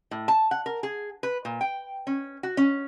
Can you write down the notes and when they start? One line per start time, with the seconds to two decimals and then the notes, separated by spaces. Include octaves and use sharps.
0.11 A2
0.28 A5
0.51 F#5
0.66 A#4
0.83 G#4
1.23 B4
1.45 A#2
1.61 G5
2.07 C#4
2.43 F#4
2.57 C#4